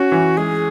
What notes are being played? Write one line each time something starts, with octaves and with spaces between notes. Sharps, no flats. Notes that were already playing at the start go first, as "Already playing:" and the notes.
Already playing: C#4 F#4
E3
G#3 G#4